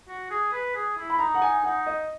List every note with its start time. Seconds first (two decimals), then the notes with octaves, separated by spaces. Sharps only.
0.08 F#4
0.31 G#4
0.53 B4
0.75 G#4
0.97 E4
1.10 B5
1.19 D#4 A#5
1.34 F#5
1.42 G#5
1.64 D#4 F#5
1.86 D#5